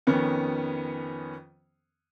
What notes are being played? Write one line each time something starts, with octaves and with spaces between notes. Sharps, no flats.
F2 D#3 B3 C#4